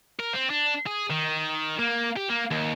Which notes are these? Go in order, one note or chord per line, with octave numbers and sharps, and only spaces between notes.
A#4
C4
D4
G#4
D#3
A#3
G4
A#3
D#2